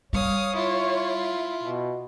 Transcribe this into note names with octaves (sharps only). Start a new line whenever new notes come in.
G3 C#5 F5 D#6
E4 F4
B2